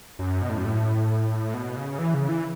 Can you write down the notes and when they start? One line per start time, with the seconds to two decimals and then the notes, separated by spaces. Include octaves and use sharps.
0.19 F#2
0.42 B2
0.49 A2
0.57 F#2
0.65 A2
1.54 B2
1.76 C#3
1.99 E3
2.14 C#3
2.29 E3